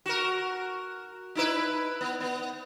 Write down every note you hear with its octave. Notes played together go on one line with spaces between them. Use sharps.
F#4 A#4
D#4 E4 B4
B3
B3